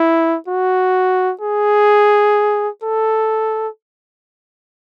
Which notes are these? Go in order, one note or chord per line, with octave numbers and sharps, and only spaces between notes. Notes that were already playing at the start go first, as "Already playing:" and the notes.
Already playing: E4
F#4
G#4
A4